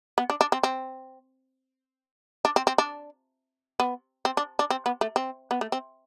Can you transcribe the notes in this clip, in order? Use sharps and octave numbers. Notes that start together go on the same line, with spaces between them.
B3
D4
D4
C4
C4
D4
C4
C4
D4
B3
C4
D4
D4
C4
B3
A3
C4
B3
A3
C4